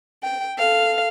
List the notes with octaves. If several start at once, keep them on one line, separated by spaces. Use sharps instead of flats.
G5
A4 F5